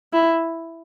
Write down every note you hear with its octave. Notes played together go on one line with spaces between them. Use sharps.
E4